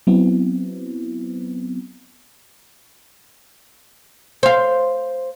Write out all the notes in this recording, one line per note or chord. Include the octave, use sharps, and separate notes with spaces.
F#3 B3 C4 E4
C5 F5